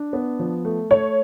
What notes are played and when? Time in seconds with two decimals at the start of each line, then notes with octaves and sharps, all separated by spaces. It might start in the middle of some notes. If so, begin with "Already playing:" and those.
Already playing: D4
0.13 B3
0.39 F3
0.65 A3
0.90 A3 C#5